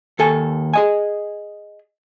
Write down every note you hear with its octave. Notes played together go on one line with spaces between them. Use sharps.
D#2 A4 G#5
G#4 D#5 G#5